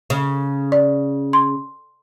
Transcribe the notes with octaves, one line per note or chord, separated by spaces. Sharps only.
C#3
D5
C6